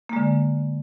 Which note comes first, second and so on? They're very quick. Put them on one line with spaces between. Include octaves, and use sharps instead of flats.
A#3 G#3 D3